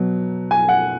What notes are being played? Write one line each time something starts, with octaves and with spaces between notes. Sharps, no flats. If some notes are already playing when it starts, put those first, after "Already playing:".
Already playing: B2 F#3
G#5
F#5